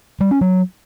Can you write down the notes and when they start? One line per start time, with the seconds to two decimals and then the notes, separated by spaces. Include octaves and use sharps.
0.21 G3
0.31 C#4
0.41 F#3